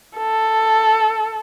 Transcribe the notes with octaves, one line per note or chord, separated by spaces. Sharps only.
A4